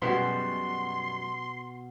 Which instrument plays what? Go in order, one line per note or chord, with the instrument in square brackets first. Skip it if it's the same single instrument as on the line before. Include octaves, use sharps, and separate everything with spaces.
[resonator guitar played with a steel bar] F#2 G3 G#3 [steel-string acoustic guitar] B2 [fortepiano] B3 F#4 [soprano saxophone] C6